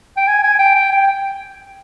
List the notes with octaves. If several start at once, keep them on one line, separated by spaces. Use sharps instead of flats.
G5
G#5
G#5
G5
G5
G5